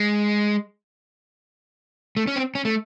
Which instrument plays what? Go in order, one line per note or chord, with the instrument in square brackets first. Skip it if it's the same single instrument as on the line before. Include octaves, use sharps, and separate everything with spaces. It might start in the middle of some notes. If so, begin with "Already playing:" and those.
Already playing: [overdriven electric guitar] G#3
A3
C#4
C4
C#4
A3